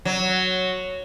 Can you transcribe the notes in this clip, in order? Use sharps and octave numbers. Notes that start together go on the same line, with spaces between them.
F#3